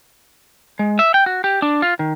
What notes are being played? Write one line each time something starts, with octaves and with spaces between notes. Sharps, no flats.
G#3
E5
G5
F#4
G4
D4
F4
D#3